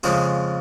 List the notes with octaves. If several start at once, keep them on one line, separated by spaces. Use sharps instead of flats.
F2 C#3 F3 G#3 G#4 C5